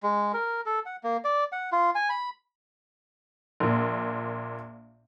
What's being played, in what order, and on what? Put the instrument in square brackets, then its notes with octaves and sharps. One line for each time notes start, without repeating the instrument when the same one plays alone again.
[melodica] G#3
A#4
A4
F#5
A#3
D5
F#5
F4
G#5
B5
[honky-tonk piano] A#1 A#2